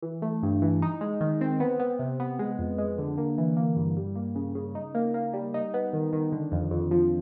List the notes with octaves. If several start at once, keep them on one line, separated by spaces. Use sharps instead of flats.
E3
A3
G2
E3
D#4
G#3
D#3
C4
B3
B3
C3
B3
G#3
F2
G#3
D3
A#3
E3
A#3
G2
G3
A#3
C#3
C#3
D#4
A#3
A#3
G3
D#4
B3
D#3
D#3
D3
F2
F2
F3